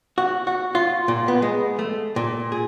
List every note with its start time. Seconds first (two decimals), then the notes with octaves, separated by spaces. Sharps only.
0.18 F#4
0.47 F#4
0.75 F4
1.08 A#2
1.28 B3
1.42 G#3
1.79 A3
2.16 A#2
2.52 G#4